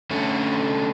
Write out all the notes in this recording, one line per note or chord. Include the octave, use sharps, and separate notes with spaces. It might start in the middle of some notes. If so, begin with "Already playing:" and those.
D3 A3 C#4